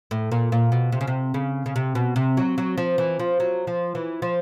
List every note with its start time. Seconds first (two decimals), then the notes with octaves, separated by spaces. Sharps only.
0.11 A2
0.32 A#2
0.52 A#2
0.72 B2
0.92 C3
1.01 C#3
1.07 C3
1.34 C#3
1.66 C#3
1.76 C3
1.95 B2
2.16 C3
2.37 F#3
2.58 F#3
2.78 F3
2.98 E3
3.19 F3
3.40 F#3
3.67 F3
3.95 E3
4.22 F3